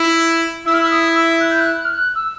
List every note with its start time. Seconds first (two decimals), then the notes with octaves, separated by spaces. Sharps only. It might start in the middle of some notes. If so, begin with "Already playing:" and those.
Already playing: E4
0.66 E4 E6
0.73 F6
0.80 E6
0.91 D#6
1.15 E6
1.40 F#6
1.50 G6
1.60 F#6
1.78 F#6
1.85 F6
1.93 F#6
2.15 E6